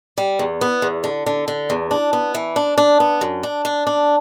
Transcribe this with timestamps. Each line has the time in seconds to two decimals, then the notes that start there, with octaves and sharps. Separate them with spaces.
0.18 G3
0.39 E2
0.61 B3
0.82 E2
1.04 D3
1.26 D3
1.48 D3
1.70 E2
1.91 D4
2.13 B3
2.35 E3
2.56 D4
2.78 D4
3.00 B3
3.21 F#2
3.43 D4
3.65 D4
3.87 D4